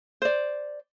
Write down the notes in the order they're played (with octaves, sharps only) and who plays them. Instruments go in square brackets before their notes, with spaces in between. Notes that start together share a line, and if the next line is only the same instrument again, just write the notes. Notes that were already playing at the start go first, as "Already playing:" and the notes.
[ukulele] C5 D5